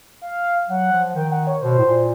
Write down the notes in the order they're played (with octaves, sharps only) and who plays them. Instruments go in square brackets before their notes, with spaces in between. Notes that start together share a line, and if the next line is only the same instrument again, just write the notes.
[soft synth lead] F5
[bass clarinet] F#3 [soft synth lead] F#5
[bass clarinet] F3
[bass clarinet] D#3 [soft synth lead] G5
[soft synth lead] F#5
C#5
[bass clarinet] B2 [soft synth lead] C5
[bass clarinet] A2
A#2